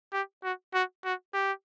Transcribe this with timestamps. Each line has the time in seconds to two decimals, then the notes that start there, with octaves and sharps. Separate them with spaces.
0.13 G4
0.43 F#4
0.74 F#4
1.04 F#4
1.34 G4